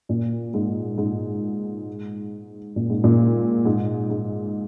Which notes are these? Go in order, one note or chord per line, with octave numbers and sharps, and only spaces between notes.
A#2
G#2
G#2
A#2
G#2
A#2
G#2
G#2